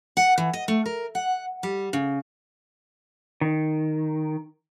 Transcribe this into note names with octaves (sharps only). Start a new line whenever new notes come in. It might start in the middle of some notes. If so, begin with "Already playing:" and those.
F#5
E3
D#5
A3
A#4
F#5
G3
C#3
D#3